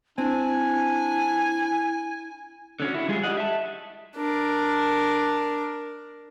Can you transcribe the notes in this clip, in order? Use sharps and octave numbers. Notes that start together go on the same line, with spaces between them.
C4 D4 E4 G#5
D3 C#4 F#4
E4 F#4
G3 G#3 F4 G#4
G4 D5 D#5 F#5
E5 A5
D4 A#4